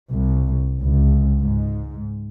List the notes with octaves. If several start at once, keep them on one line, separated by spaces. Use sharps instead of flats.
C2
C#2
G#2